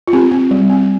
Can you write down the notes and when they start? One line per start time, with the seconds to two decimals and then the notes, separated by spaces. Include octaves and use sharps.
0.08 F4
0.13 C4 G4
0.31 C4
0.51 G3
0.70 C4